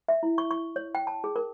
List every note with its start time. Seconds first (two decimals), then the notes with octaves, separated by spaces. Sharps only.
0.09 E5
0.23 E4
0.38 C#6
0.51 C#6
0.76 C#5
0.95 G5
1.07 A5
1.24 G#4
1.36 A#4